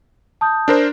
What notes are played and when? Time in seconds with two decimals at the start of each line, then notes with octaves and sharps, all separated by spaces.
0.41 A5 D#6 G6
0.68 D4 A#4 C5